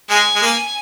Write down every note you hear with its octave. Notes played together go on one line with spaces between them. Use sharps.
G#3 G#5
G#3
A#3